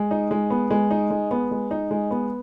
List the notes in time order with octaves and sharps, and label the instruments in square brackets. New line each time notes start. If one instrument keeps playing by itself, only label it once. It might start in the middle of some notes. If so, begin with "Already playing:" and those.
Already playing: [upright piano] G#3
D#4
G#3
B3
G#3
D#4
G#3
B3
G#3
D#4
G#3
B3